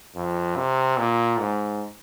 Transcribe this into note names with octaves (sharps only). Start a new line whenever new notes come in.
F2
C3
A#2
G#2